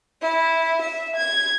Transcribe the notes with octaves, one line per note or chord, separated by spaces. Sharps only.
E4
E5
G#6